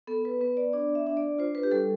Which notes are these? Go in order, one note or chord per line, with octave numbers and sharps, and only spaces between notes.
B3 A4
B4
B3 B4
D5
D4 D5
E5
D4
D5
F4 C5
B4
G4
G3 A4